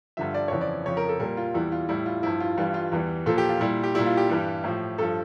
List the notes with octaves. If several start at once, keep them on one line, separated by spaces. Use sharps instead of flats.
G2 D3 F3 E5
D5
F2 C#3 E3 C#5
D5
F2 C#3 F3 C#5
A#4
A4
A#2 G3 A#4
F4
E2 E3 G3 E4
F4
A2 G3 E4
F4
G2 F3 E4
F4
G2 E3 G3 F4
F4
E2 E3 G3
A#2 F3 A4
G4
F4
A#2 G3 E4
G4
A#2 G3 E4
F4
G4
G2 E3 G3
A2 F3
G2 F3 A4